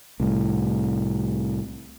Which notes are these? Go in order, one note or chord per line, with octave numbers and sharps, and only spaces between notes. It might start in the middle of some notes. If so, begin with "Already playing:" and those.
C2 A2